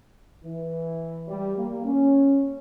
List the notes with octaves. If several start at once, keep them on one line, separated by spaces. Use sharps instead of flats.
E3
G3
A#3
C#4